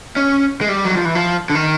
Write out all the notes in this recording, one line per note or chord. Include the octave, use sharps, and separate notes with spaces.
C#4
G#3
G3
F#3
F3
E3
F3
D3
D#3